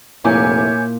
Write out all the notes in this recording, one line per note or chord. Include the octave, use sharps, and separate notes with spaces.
F1 A#2 E4 C#5 G#5 D6 G6